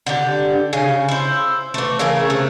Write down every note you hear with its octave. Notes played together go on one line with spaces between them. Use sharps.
D3 G4
C#3 G#5
E4 C5
E3 A3
C#3 A3 A#4 G#5
C3 A3